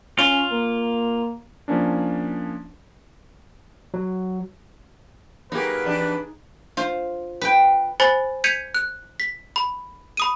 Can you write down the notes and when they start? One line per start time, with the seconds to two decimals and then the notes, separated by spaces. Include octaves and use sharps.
0.19 C#4 F4
0.52 A#3
1.68 F3 A#3 C#4 D4
3.94 F#3
5.52 F#3 A#3 D#4 G4 G#4 B4
5.85 E2 D4 G4
6.77 F4 C5
7.41 B4 G5
8.00 C5 G#5 B5 A6 F#7
8.44 G6 G#6 B6 C#7 D#7 F7
8.74 F#6
9.20 B6
9.56 B5
10.17 B5 D#6 D#7